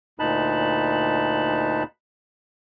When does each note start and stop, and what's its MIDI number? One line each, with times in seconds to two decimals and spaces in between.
0.19 1.83 38
0.19 1.83 46
0.19 1.83 63
0.19 1.83 81
0.19 1.83 83
0.19 1.83 90